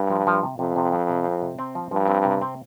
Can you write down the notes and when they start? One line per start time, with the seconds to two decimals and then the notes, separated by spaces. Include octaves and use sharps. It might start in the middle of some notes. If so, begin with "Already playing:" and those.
Already playing: G2
0.10 F3
0.27 F3
0.43 C3
0.59 F2 C3
0.76 C3
0.92 F3
1.10 C3
1.25 C4
1.42 C3
1.59 C4
1.75 F3
1.91 G2 F3
2.08 C4
2.25 C3
2.41 C4